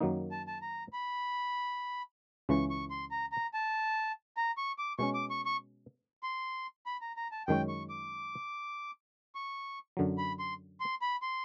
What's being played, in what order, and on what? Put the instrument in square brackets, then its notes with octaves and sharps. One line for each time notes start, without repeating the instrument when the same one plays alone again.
[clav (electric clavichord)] F#2 D#3 F#3 A#3 D#4
[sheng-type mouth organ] A5
A5
A#5
B5
[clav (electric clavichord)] C#2 C#3 E3 [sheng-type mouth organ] C#6
[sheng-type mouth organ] C#6
C6
A#5
A#5
A5
A#5
C#6
D6
[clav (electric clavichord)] B2 G#3 C#4 [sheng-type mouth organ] C#6
[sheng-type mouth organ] D6
C#6
C#6
C6
B5
A#5
A#5
A5
[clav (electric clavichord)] F#2 D#3 G#3 C#4 [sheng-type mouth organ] G5
[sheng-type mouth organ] C#6
D6
C#6
[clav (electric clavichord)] F#2 D3 F#3
[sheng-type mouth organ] B5
C6
C6
B5
C6